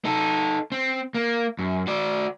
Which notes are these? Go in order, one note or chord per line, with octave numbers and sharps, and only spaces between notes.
D#4 A4
C4
A#3
F#2
F#4 D5